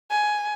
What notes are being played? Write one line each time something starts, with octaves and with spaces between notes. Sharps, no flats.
G#5